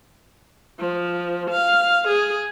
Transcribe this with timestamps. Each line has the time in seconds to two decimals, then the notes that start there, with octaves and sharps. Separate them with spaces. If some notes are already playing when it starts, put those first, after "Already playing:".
0.80 F3
1.51 F5
2.08 G#4